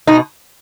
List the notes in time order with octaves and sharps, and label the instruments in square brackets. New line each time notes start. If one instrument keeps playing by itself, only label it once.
[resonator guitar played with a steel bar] B2 D#4